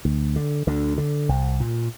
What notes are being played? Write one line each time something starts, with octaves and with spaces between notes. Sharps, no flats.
D2
D3
D2 D3
D3
C2
A#2